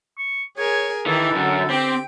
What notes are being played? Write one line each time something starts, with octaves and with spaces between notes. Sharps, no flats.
C#6
G#4 A#4 C#5 G#5
D#3 E3 D#4 G4 A4
F#2 D3
C4 G4 G5